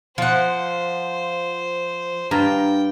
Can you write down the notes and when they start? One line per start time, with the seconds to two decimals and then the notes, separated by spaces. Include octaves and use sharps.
0.18 F3 C5 F#5
2.31 G2 F4 G5 A#5